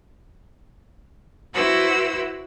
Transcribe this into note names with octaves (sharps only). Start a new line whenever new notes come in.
E4 F#4 B4 C5 F#5 E6